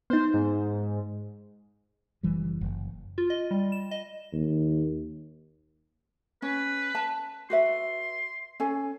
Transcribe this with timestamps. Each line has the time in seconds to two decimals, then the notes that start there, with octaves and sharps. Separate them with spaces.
0.10 B3 D#4 C5
0.34 G#2
2.23 F#1 E3 G3
2.61 F#1
3.18 F4
3.30 D#5
3.51 G3
3.72 E7
3.91 D#5
4.33 D#2
6.42 C#4 B4
6.95 A5
7.50 F#4 B4 E5 C6
8.60 C#4 A4 G#5